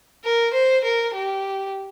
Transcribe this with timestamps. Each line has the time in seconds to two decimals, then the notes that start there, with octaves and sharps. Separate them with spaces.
0.24 A#4
0.53 C5
0.84 A#4
1.14 G4